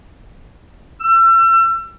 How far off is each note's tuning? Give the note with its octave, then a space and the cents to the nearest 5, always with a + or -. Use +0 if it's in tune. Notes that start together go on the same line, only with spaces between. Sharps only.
E6 +35